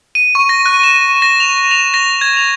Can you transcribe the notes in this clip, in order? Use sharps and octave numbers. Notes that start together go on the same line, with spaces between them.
D#7
C#6
A#6
F#6
E7
A#6
F7
F7
A#6
G#6
F7